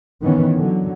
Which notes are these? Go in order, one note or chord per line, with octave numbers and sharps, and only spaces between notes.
D#3 E3 B3 C#4
D3 F#3